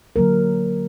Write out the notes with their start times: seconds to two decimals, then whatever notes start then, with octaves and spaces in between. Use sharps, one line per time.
0.16 D3 F#3 A#3 A#4